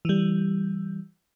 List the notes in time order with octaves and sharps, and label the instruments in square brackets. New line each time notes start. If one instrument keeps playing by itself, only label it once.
[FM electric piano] E3 G3